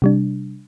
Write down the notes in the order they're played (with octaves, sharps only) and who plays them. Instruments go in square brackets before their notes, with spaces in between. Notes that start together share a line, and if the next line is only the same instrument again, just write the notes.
[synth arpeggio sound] C3 G3 D4